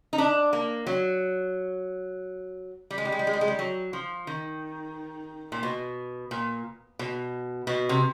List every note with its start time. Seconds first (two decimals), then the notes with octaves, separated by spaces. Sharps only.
0.13 D#4
0.18 D4
0.53 A#3
0.87 F#3
2.90 G3
2.98 G#3
3.05 G3
3.12 G#3
3.19 G3
3.27 G#3
3.33 G3
3.41 G#3
3.48 G3
3.59 F#3
3.93 F3
4.27 D#3
5.52 A#2
5.63 B2
6.31 A#2
6.99 B2
7.67 B2
7.89 C3